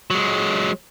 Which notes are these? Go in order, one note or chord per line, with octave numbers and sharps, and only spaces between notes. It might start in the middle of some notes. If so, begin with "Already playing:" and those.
F#3 G#3